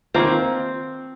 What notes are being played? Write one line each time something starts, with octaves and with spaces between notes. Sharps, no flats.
D#3 A#3 C4 F4